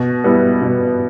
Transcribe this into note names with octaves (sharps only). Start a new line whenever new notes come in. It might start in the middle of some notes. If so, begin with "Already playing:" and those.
Already playing: B2
G3 B3 E4
B2